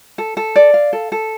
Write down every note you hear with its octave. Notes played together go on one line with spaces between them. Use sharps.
A4
A4
D5
F5
A4
A4